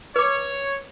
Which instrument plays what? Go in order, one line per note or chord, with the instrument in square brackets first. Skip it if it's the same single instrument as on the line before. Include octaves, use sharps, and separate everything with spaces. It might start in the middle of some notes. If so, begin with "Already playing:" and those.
[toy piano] B4 D6 [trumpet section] C#5